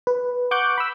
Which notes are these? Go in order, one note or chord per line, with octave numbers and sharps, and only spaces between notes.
B4
F#5 C#6 D6 F#6 G6
B5 E6